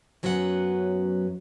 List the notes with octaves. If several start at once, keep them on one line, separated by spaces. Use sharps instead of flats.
F#2 F#3 B3 C#4 F4 F#5